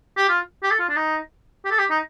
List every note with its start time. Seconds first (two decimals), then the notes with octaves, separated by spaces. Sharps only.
0.17 G4
0.29 F4
0.63 G4
0.71 A4
0.79 F4
0.89 D4
0.96 D#4
1.65 G4
1.71 A4
1.78 G4
1.90 D#4